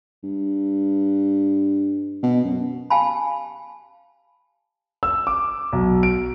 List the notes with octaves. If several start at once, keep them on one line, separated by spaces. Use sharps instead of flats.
G2
B2
F#2
G4 F5 G#5 A5 B5
E6
D6
B1
D7